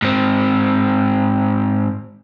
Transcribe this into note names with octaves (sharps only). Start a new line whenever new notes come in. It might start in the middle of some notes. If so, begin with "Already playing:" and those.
G#2 C4